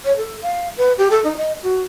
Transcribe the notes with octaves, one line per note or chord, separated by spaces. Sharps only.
C#5
A4
F5
B4
G4
A4
D#4
D#5
F#4